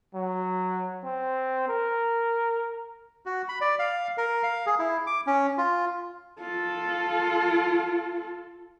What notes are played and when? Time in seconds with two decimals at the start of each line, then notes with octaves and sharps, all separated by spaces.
0.14 F#3
1.03 C4
1.68 A#4
3.26 F#4
3.49 B5
3.61 D5
3.79 F5
4.17 A#4
4.43 F5
4.66 G#4
4.79 E4
5.07 D6
5.27 C#4
5.58 F4
6.40 F4 A4